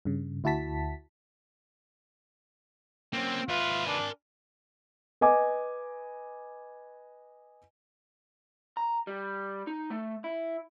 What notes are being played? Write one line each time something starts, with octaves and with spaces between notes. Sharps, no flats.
G2 C#3
D2 E4 F#4 A5 B6
A#3 C4 C#4
D#2 G#2 F4 B4 E5
D4 A#4 G#5
B4 D#5 G#5 D6
A#5
G3
D#4
A3
E4